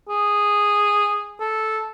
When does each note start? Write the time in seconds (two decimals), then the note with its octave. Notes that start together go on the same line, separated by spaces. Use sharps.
0.09 G#4
1.40 A4